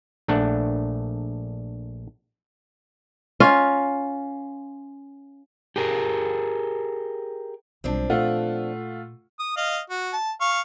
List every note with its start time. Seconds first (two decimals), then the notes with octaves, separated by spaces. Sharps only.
0.28 A#1 A3 D4 F#5
3.40 C#4 F4
5.76 G4 G#4 A#4
7.84 B1 F3 G3 C4 D4
8.10 A#2 A3 F4 F#5
9.40 D#6
9.57 D#5 F5
9.90 F#4
10.13 A5
10.41 F5 C#6